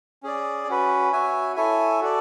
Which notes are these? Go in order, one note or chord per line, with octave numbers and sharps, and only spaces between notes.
C#4 G#4 D5
C#4 F#4 B4
F#4 C#5 E5 G#5
E4 A4 C#5 E5 G#5
F#4 A4 D5